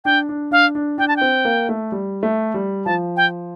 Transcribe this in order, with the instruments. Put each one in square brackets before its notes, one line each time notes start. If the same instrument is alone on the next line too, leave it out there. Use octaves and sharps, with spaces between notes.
[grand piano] D4 [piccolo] G5
[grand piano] D4
[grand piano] D4 [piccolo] F5
[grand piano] D4
[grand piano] D4 [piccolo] G5
[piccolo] A5
G5
[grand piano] C4
A#3
A3
G3
A3
G3
[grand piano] F3 [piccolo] A5
[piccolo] G5